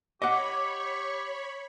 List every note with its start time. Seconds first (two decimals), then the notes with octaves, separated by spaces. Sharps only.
0.22 G4 C#5 D#5 F#5 B5 C#6 D6